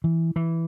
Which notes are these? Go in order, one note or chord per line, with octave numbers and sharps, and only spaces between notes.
E3
E3